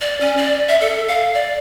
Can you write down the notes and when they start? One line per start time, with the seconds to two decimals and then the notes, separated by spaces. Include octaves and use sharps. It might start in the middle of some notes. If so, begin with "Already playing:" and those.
0.01 D5
0.21 C#4
0.37 D5
0.69 E5
0.81 A4
1.08 F5
1.34 D5